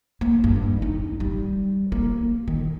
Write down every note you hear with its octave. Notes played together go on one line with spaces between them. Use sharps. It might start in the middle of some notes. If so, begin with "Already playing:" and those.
A#3
G2
D#4
G3
A#3
D#3